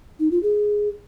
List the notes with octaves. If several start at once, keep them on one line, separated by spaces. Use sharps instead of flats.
D#4
F4
G#4